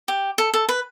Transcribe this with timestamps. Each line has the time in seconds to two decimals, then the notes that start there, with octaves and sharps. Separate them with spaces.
0.08 G4
0.38 A4
0.54 A4
0.69 B4